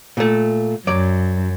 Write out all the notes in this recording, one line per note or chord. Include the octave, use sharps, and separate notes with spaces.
A#2 A3
F#2 F#3 D5